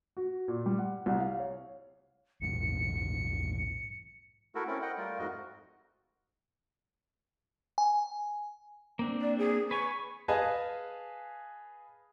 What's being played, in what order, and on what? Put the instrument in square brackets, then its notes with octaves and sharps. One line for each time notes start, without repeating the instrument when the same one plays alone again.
[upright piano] F#4
A#2
G3
F#5
C2
F5
C#5
[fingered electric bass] A#1 E2 G#2 [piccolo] C#7
[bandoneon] A3 E4 F#4 A4 A#4
C4 C#4 E4 A4 A#4
D#5 F#5 G5
G3 A3 F4 A#4
F2 G#2 F#4 D#5
[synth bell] G#5
[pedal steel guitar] A#3 C4 D4
[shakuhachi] D5
G#4
[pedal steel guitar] B4 G#5 [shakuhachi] C#6
[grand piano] G#4 B4 D#5 F5 G#5 A5